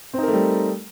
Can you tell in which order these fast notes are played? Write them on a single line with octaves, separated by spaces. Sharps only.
C4 D#4 A#4 A3 G3